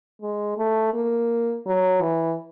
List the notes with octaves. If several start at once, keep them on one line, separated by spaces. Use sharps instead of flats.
G#3
A3
A#3
F#3
E3